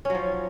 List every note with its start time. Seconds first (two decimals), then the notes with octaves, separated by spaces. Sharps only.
0.05 C#4
0.10 F#3
0.15 F3